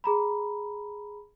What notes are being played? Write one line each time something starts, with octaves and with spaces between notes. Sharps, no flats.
G#4 A#5 B5